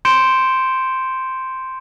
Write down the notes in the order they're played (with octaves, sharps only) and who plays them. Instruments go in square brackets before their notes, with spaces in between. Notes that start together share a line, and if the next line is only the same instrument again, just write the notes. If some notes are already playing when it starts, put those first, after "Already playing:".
[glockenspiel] C6 G6 C#7 D7 E7 G7